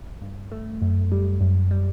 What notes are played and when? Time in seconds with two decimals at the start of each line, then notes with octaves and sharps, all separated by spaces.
0.22 G2
0.52 A3
0.82 F#2
1.12 G3
1.41 F#2
1.71 G3